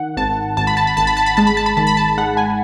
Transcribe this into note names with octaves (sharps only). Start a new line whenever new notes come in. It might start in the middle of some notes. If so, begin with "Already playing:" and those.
Already playing: D#3 F#5
G#1 A5
G#1 A5
B5
A5
B5
G#1 A5
B5
A5
B5
G#3 A5
B5
A5
B5
D#3 A5
B5
A5
G#3 F#5
G#5